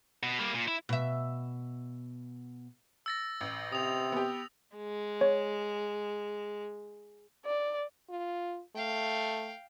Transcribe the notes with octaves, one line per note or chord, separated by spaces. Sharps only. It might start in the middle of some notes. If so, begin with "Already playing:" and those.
B2
G3 A#3
A#2
E4
B2 E5
E6 A6 A#6
A1
C3 D#6 F7
B3 G4
G#3
C#5
D5
F4
A3 F5 G5